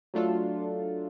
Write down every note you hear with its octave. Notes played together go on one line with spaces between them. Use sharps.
F#3 A3 D4 F4 A4